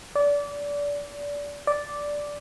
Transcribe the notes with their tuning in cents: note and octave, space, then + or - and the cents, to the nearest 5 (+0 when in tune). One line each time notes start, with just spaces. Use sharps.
D5 -25
D5 -5